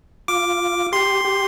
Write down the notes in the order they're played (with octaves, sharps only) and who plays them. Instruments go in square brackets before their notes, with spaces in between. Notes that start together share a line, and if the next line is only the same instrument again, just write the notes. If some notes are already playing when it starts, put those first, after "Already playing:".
[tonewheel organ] F4 [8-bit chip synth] D6
[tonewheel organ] G4 [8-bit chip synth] C6
[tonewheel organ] G4